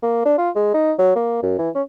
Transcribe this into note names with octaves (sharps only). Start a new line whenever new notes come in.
A#3
D4
F4
G#3
D#4
F#3
A#3
F#2
E3
C#4